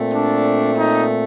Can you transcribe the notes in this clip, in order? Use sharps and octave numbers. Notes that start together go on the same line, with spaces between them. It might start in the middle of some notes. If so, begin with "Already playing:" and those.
Already playing: A#2 A3 C4
D4
D#4